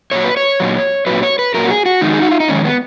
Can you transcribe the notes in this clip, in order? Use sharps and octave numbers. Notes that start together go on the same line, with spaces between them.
A#2 F#3 C#5
B4
C#5
A#2 F#3
A#2 F#3 B4
C#5
B4
A#2 F#3 A#4
F#4
G#4
F#4
F2 D#3 G#3 D#4
G#4
F#4
F4
D#4
F2 D#3 G#3 C#4
B3